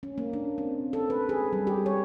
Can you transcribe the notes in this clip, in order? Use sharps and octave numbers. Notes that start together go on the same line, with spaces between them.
C#4
A#3
D4
C4
A4
B4
G#4
G3
G4
C#5